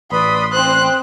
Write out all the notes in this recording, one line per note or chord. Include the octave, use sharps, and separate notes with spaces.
A1 B4 D5 B5 C6 D#6
C4 C5 C6 F#6